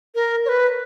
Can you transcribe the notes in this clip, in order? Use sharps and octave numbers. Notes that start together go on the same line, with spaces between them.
A#4
C#5
B4